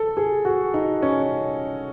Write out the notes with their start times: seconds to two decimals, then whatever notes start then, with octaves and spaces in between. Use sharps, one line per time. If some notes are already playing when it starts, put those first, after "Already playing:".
Already playing: A4
0.17 G#4
0.45 F#4
0.74 D#4
1.02 C#4